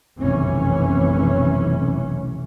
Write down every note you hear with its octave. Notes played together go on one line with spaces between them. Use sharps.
F1 B1 F#2 E3 C#4